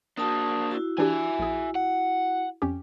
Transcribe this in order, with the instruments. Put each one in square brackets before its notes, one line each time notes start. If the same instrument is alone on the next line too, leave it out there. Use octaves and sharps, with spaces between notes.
[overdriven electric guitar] A#3 D4 [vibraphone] F#4 A5 D#6
[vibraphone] E4 F#4
[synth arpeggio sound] E3 D4 G4 [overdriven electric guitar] E5 G#5
[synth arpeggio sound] A#1 G#4
[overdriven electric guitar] F#5
[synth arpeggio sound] F2 C#4 G4